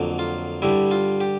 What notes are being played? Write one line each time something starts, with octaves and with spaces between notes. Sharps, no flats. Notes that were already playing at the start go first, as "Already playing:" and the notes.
Already playing: F2 D3 F#3 A#3
F4
G2 D3 G3 E4
F4
G4